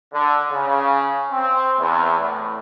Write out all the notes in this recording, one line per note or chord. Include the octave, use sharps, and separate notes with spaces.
D3
C#3
C4
E2
A2